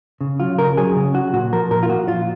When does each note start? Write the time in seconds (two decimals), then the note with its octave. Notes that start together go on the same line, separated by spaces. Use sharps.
0.21 C#3
0.40 F#3 F4
0.58 C#3 A#4
0.77 F#3 G#4
0.96 C#3
1.15 F#3 F#4
1.33 A#2 F#4
1.52 F3 A#4
1.71 A#2 A#4
1.83 F4
1.90 F3 F#4
2.08 A#2 F4